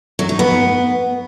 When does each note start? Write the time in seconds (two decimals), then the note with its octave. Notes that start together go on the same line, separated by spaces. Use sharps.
0.19 F#3
0.29 D#4
0.39 B3